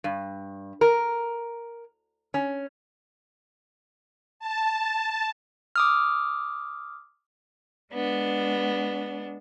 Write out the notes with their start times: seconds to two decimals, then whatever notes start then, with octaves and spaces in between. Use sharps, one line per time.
0.04 G2
0.81 A#4
2.34 C#4
4.40 A5
5.76 D6 D#6 F6
7.93 G#3 B3 D4